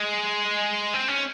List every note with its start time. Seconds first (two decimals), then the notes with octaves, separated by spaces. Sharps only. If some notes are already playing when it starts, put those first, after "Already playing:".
Already playing: G#3
0.94 C4
1.08 C#4